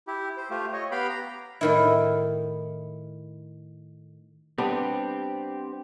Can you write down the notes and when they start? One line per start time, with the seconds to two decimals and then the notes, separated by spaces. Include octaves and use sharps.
0.07 E4 G4
0.37 C5
0.50 A3 F4 G4
0.73 C#5 D#5
0.91 B3 G4 F5 G5 B5
1.09 A#5
1.61 A2 D#3 E4
4.58 G3 B3 C4 D4 G4